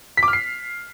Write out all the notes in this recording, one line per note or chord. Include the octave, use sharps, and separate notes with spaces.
B6
D6
F6
C7